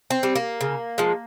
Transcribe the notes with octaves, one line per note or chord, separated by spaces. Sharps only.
C4
G3
A#3
C#3
F3 G#3